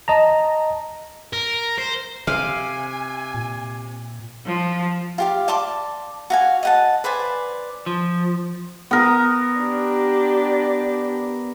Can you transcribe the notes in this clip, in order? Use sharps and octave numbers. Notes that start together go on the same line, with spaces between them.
D#5 A5 A#5
A#4
C5
C3 F5 G#5
A#2
F3
F4 G4 F5
D5 A5 C6 D6
F#4 F5 G#5
D#5 F#5 A5
B4 C5 D5 G#5
F3
B3 A#4
D4 G4